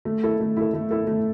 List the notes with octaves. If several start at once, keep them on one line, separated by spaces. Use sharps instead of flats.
A3
E4 A4
A3
E4 A4
A3
E4 A4
A3